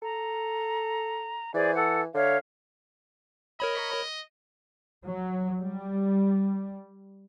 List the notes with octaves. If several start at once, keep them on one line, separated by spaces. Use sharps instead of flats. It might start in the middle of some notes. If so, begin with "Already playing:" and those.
A4 A#5
E3 G#4 C5 D5
A4 F#5
D3 C#5 E5 F5
A#4 C#5 D#5 B5
F#3
G3